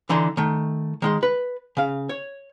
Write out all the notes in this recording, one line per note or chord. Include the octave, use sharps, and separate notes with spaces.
D3 E3 D#4 A4 C6
D#3 A3
D#3 G#3 C6
B4
C#3 F5
C#5